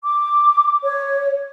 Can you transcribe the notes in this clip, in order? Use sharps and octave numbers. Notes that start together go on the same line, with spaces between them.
D6
C#5